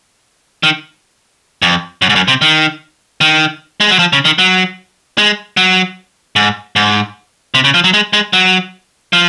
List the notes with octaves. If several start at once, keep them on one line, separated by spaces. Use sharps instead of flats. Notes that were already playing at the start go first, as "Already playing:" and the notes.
D#3
F2
F#2
G#2
F#2
C3
D#3
D#3
G#3
F#3
F3
C#3
D#3
F#3
G#3
F#3
G#2
G#2
C3
C#3
F3
F#3
G#3
G#3
F#3
F3